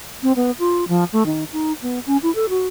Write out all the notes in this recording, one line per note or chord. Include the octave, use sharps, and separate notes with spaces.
C4
B3
F4
F3
A3
D#3
D#4
B3
C#4
E4
A4
F#4